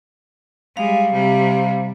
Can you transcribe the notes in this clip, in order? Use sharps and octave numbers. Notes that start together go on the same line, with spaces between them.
G3 G#3 F5
C3 G3